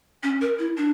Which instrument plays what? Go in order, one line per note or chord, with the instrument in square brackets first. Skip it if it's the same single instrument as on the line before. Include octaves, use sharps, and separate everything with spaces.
[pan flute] C#4
A#4
E4
D4